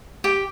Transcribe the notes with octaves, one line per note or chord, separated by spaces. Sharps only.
G4